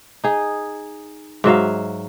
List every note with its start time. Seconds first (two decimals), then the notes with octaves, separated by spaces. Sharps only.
0.24 D#4 G#4
1.44 G#2 F#3 E5 F5